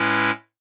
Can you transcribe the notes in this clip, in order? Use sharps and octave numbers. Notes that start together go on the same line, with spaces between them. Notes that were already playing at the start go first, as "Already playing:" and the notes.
Already playing: A2 G#3 C#4 E4 B4